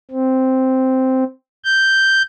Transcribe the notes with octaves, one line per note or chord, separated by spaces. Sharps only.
C4
G6